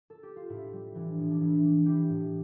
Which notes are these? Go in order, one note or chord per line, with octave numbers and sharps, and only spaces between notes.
A4
G4
F4
A2 E4
G3
E3 D4
A2
D4
E3 E4
G3
E3 E4 G4
A2